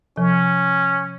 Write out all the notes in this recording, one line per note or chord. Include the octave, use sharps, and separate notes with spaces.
C3 F3 C#4